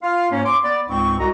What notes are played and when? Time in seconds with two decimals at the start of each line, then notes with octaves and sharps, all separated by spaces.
0.02 F4 F5
0.31 G#2 A#3 C#4
0.44 C6 D6
0.63 B3 D5
0.88 C#2 G#2 C4 C#6
1.18 C2 F#4 D#5 A#5